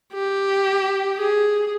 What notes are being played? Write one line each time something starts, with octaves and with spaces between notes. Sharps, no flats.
G4
G#4